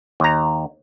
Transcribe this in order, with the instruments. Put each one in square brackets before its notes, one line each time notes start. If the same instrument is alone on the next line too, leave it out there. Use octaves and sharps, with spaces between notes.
[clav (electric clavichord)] D#2 A#5